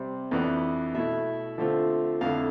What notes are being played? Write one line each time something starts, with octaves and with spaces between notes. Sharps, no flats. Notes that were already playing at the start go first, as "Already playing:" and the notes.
Already playing: C3 G3 C4
F2 E3 B3 D4
B2 A3 E4 E5
D3 F3 A3 C4 F4
F2 D3 A3 E4 F5